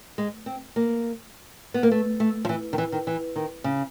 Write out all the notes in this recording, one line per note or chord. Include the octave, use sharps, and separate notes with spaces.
G#3
C4
A#3
B3
A#3
A3
A3
F3
E3
D#3
E3
D#3
E3
D#3
C#3